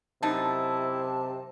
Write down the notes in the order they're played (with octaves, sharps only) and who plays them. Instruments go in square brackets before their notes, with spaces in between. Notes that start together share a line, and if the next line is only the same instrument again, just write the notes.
[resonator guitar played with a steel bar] F#2 D#4 [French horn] C3 [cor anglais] E4 [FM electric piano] A5